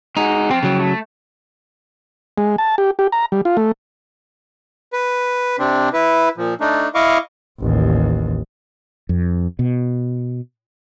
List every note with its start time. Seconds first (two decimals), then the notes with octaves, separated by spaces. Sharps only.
0.17 G#3 D#4 F#4
0.51 F3 C4 G5
0.63 C#3 F#3
0.80 A3
2.38 G#3
2.58 A5
2.78 G4
2.99 G4
3.12 A#5
3.32 G3
3.45 F4
3.57 A3
4.93 B4
5.59 C3 C4 D4
5.93 E4 B4
6.37 A#2 F3
6.61 A3 D4 D#4
6.95 E4 D#5 F5 C#6 D6
7.61 A1 D#2
9.09 F2
9.59 B2